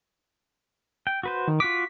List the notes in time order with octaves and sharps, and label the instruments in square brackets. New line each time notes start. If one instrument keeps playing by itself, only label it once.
[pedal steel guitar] G5
F#4 B4 C5
[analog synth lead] D#3
[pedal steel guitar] F4 F#4 D6 [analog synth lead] B6